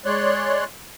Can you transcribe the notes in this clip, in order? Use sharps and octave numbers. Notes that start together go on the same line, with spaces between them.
G#3 C#5 D5 C6 F#6